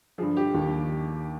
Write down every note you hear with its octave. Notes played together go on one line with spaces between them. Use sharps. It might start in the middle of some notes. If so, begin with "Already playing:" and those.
G2 D3 F3 G#4
G4
D#2 D#3